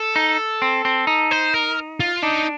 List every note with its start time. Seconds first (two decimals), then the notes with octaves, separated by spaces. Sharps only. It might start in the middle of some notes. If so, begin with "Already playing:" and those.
Already playing: A4
0.16 D#4
0.62 C4
0.85 C4
1.07 D#4
1.31 C5
1.54 A#4
2.00 F4
2.23 D4 D#4